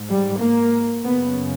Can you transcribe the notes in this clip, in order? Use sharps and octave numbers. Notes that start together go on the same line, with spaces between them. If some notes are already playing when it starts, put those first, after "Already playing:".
Already playing: G#2
G3
A#3
F#2 C#3 B3